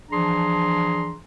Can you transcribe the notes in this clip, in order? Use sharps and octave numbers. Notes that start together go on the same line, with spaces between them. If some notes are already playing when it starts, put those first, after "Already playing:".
E3 F3 D4 G#4 A#5 C6